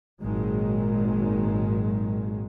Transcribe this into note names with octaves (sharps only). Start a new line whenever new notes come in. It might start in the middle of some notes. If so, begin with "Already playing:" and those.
G#1 A#2 D#3 F#3 G#3